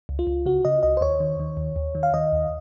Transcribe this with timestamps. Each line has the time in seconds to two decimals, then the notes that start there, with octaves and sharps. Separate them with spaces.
0.09 C#2
0.19 F4
0.27 C#2
0.46 C#3 F#4
0.65 C#3 D#5
0.83 C#2 D#5
0.97 C5
1.01 D#2 C#5
1.20 D#3
1.40 D#3
1.57 D#2
1.76 D#2
1.95 D#3
2.03 F5
2.14 D#3 D#5
2.32 D#2